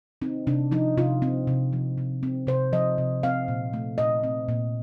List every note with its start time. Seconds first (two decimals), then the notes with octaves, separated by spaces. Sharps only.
0.22 C4 D#4
0.47 C3 D4
0.71 F3 D#4
0.97 C3 F4
1.22 C4
1.47 C3
1.73 F3
1.98 C3
2.23 C4
2.47 C3 C5
2.73 F3 D#5
2.98 C3
3.23 C4 F5
3.48 A#2
3.73 A3
3.98 A#2 D#5
4.23 C4
4.49 A#2